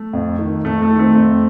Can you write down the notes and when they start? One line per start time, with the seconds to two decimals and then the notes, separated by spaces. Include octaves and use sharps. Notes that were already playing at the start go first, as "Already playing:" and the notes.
Already playing: A3
0.13 F2
0.39 D#3
0.65 F2 A3
0.82 A3
0.91 D#3
0.99 A3 C4
1.16 F2